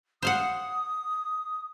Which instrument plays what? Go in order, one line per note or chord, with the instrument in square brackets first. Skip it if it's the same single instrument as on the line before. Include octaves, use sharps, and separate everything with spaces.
[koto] C5 F5 F#5 [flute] D#6